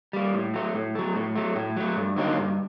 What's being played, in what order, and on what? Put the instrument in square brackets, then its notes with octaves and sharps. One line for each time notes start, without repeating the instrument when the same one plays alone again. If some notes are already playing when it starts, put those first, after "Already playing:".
[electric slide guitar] G3 A#3
A2
F#3 A3
A2
F#3 A3
A2
F#3 A3
A2
F#3 A3
G2
D3 F#3 A#3 D#4
G2